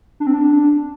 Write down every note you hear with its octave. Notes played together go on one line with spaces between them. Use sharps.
D4
C4
D4